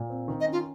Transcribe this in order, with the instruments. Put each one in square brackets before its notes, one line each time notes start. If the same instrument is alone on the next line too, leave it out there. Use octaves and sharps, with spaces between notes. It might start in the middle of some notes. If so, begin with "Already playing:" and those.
Already playing: [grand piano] A#2
C4
D#3
[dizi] D#5
[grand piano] C#4
[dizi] F4